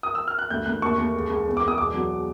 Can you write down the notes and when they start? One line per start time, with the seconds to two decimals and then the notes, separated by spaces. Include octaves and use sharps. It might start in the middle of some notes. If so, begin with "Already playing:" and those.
0.03 D#6
0.15 E6
0.28 F6
0.39 F#6
0.50 D2 G6
0.66 D2 F#6
0.82 D#2 C#6
0.98 D#2
1.14 C#2
1.30 C#2
1.46 E2
1.57 D6
1.62 E2
1.68 D#6
1.78 E1 D6
1.94 F#3